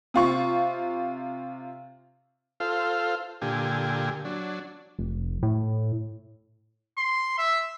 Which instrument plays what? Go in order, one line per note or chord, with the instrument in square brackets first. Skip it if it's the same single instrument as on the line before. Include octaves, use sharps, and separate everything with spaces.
[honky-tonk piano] C3 F4 C#6
[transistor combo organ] F4 A4 C5 F5
A#2 D3 G4 G#5
F#3 D4
[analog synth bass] F1
A2
[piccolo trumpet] C6
E5